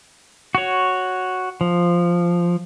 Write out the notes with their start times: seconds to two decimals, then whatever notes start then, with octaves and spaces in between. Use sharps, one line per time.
0.55 F#4 C#5
1.61 F3